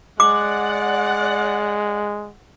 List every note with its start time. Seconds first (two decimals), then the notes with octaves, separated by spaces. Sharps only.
0.20 G#3 D5 F#5 D6